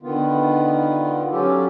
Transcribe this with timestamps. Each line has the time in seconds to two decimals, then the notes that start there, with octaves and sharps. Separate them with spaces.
0.03 D3 D#3 B3 F4
1.32 F#3 C#4 F4 G4 A4